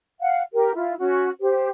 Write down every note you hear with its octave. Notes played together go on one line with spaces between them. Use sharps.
F5 F#5
G4 A#4
E4 F4
C#4 F#4
G4 C5